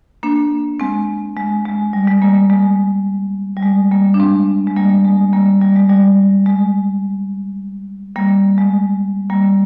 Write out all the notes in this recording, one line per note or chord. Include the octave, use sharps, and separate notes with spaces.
A#3 D4
G#3 C4
G#3
G#3
G3
G#3
G3 A#3
G#3
G3
G#3
G3 A#3
D4
G#3 C4
G#3
G3 A#3
G#3
G3 A#3
G3
G#3
G3
G#3
G3 A#3
G#3
G3 A#3